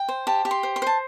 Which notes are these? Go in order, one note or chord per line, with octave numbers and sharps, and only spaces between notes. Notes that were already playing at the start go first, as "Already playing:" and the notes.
Already playing: G5
C5
G4 A5
G4
C6
C5
C6
C5 A5